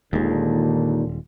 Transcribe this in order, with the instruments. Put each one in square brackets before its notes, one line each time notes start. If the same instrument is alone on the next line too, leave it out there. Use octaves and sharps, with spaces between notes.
[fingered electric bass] D#1 G#3 [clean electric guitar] D#2 [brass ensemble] A#2 D3